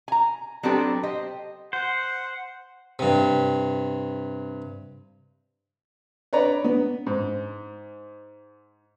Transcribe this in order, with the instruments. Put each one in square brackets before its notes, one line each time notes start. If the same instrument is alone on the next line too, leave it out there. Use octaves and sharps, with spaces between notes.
[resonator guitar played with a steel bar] G#5 A#5
F#3 B3 C4 D4 G4 A4
G4 C5 D#5
[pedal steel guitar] C5 [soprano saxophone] F#5
[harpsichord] G2 C3
[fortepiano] B4 C#5 D5 A#5
B3
G#2